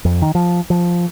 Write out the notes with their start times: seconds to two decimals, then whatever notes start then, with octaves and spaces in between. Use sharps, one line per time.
0.05 F2
0.22 D#3
0.35 F3
0.70 F3